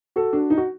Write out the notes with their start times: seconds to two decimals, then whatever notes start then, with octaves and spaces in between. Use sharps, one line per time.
0.16 F#4 A4
0.33 D4 F#4
0.50 D#4
0.57 F#4